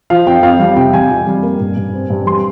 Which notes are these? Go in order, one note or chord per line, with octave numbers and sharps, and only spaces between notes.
F3 F5
F2 G5
F2 F5
G3 F5
C3 G5
G3 G#5
F2
G3
A#3
G2
G2
C4
G2
G3 C6